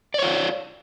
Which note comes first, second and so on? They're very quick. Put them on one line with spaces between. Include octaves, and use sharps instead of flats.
D5 C#5 F4